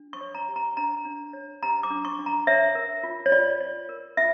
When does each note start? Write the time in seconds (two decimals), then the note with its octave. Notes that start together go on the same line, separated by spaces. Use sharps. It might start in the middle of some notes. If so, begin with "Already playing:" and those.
Already playing: D4
0.13 C#6
0.21 C#5
0.34 A#5
0.48 G4
0.56 A#5
0.77 D4 A#5
1.05 D4
1.33 C#5
1.62 G4 A#5
1.83 D6
1.90 D4
2.05 C#6
2.19 D4
2.26 A#5
2.47 C#5 E5
2.75 A#4
3.03 F4
3.26 C#5
3.32 F4 D5
3.61 C#5
3.89 A#4
4.17 F4 E5